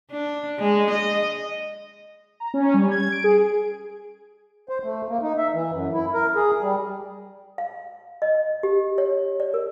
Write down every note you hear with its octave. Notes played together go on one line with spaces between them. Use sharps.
D4
G#3
D#5
A#5
C#4
G3
G#6
D7
G#4
C5
A3
A#3
D#4
E5
E3
F#2
E4
A#4
G#4
G3
F5
D#5
G4
C#5
D5
A#4